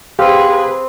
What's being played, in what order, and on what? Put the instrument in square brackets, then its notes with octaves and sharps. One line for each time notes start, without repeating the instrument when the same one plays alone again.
[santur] C4 [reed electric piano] G4 F5 [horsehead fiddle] G#4 B4